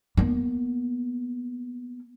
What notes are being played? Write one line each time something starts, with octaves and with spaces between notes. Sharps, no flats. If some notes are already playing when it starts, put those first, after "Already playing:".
A#3 B3